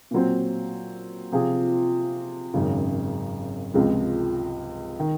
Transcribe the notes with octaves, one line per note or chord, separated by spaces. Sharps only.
A#2 F#3 C4
C3 F3 C4 F4 G#4
G#1 F#2 C#3
C#2 C3 F3 G#3
D#3